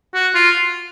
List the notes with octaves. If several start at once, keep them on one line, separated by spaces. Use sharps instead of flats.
F#4
F4